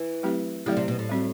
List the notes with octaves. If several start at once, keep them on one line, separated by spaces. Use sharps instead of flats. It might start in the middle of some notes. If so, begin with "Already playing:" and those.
Already playing: E3
F#3 A3 C4 E4 G4
D3 F#3 A3 C4 E4 G4
C3
B2
A2
G3 C4 F#4